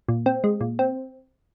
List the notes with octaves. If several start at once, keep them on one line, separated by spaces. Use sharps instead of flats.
A#2
C4
G#3
A#2
C4